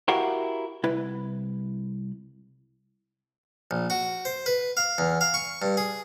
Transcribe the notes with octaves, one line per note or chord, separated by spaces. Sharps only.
E4 F#4 G4 A#4 F5 F#5
C2 E4 B4
A#1
F#4
C5
B4
F5
E2
F5
C#6
G2
G#4